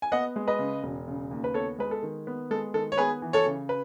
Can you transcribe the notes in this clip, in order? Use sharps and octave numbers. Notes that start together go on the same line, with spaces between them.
G#5
B3 D#5 F#5
G#3
B4 D#5
C#3
E1
C#3
D#2
B4
B3 A4 C#5
G#3 B4
A4
D#3
B3
G#3 A4
D#3 A4
C#5
B3 G#4 B4
E3
A4 C#5
C#3
B4